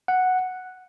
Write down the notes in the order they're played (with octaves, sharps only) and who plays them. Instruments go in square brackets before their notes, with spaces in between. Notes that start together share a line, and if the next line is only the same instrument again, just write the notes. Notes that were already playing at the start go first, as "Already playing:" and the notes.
[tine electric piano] F#5